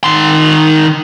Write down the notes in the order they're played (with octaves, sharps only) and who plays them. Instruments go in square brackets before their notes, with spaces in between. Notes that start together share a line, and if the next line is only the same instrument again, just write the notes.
[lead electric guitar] D#3 C6